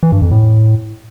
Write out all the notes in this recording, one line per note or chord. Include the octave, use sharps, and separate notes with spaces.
E3
G2
F2
A2